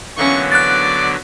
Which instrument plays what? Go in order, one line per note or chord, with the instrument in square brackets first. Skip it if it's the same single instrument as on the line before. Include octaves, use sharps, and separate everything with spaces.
[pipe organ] D3 F#3 B3 [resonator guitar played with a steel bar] E3 A#3 C#4 [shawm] C#6
[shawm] D5 [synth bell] F#6 A6